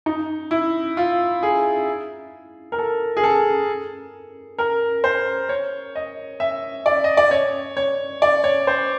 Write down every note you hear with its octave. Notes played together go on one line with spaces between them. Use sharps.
D#4
E4
F4
G#4
A#4
A4
G#4
A4
A#4
C5
C#5
D#5
E5
D5
D#5
D5
C#5
C#5
D5
C#5
C5